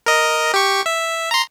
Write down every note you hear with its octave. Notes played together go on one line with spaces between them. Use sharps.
A#4 D#5
G4 C#6
E5
A#5 C6